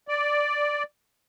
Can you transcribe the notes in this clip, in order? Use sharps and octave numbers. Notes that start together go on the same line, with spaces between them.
D5